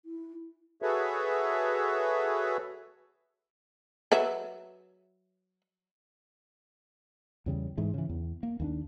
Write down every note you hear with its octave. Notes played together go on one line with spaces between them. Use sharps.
E4
F#4 G#4 A4 B4 C#5 E5
F#3 B4 E5
E2 C#3 G3
G#2 E3
C#3 E3
E2
A#3
D#2 A3 D4